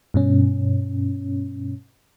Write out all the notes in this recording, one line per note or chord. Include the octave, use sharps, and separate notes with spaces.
G2 B2 C#4